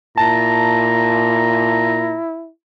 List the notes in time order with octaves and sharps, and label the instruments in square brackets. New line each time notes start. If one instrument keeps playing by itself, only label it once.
[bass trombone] A#2 [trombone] E4 [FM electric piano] A5 [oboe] A#5